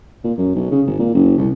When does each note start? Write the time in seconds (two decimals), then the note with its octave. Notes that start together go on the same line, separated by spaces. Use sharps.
0.24 A#2
0.38 F#2
0.55 B1
0.71 C#3
0.86 G#1
0.99 A#2
1.14 F#1
1.38 C2